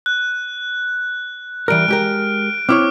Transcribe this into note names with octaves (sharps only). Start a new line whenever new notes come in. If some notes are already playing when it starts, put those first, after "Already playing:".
F#6
E3 G3 A#4 F6 D7
G#3 G4 A#4
C4 E4 C#5 D6 F6